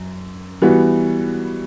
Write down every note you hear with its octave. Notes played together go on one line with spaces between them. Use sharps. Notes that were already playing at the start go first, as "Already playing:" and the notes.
Already playing: F#2
E3 G3 B3 F#4